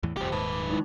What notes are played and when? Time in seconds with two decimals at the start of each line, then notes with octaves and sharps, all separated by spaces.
0.03 E2 A2 E3
0.17 F#1 C2 F2 F3 G4 C5 D6
0.32 D#1 G#2 D#3 B4 A5
0.52 D6
0.69 G#3 D#4 E4